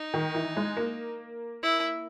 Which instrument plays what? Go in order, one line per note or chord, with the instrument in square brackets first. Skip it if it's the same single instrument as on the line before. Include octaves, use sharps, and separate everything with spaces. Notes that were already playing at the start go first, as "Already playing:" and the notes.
Already playing: [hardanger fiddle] D#4
[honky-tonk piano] D#3
E3
G#3
A#3
[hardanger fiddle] E4